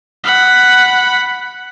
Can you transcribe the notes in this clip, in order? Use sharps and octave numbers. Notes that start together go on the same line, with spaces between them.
F#5 B5